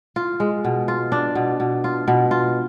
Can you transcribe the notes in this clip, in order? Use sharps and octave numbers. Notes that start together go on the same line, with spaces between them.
F4
G#3
B2
F4
D4
B2
B2
F4
B2
F4